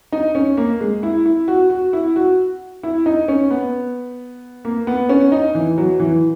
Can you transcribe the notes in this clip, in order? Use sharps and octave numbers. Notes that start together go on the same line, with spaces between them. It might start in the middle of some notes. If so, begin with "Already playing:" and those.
D#4
C#4
A#3
G#3
E4
E4
F#4
F#4
E4
F#4
E4
D#4
C#4
B3
A#3
B3
C#4
D#4
E3
F#3
E3